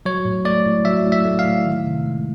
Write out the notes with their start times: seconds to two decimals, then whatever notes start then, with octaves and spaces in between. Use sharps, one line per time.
0.05 F#3 C#5
0.25 A2
0.45 A3 D5
0.66 A2
0.85 F#3 E5
1.05 A2
1.12 E5
1.25 A3
1.39 F5
1.45 A2
1.65 D#3
1.86 C3
2.06 G#3